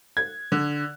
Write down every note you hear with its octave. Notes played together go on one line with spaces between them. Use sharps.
G#6
D3